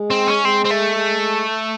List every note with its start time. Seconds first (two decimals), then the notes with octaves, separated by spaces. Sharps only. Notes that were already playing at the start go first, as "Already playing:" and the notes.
Already playing: G#3
0.10 C4
0.27 C#4
0.45 G#3 C4
0.65 C4
0.70 A3
0.96 G#3